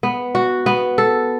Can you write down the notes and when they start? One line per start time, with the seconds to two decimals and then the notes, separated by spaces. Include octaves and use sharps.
0.03 B3
0.35 F#4
0.66 B3
0.98 A4